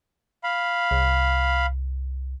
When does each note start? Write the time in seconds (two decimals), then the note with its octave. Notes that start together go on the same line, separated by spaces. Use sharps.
0.43 F5 B5
0.91 C2